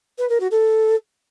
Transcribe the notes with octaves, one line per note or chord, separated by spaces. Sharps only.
B4
A#4
F#4
A4